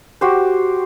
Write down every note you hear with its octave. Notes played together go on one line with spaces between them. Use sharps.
F#4 G4 C5